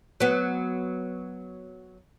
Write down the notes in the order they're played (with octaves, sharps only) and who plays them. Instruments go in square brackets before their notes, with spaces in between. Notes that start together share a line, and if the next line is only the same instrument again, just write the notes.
[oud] F#3 B3